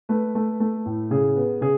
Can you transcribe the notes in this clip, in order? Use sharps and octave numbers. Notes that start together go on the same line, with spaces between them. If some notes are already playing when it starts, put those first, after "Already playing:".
A3 B4
A3
A3
A2
C#3 G#4
B3
C#3 G#4